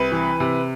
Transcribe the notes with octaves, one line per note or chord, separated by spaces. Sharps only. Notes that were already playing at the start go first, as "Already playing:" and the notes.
Already playing: C2 B4
E3
C3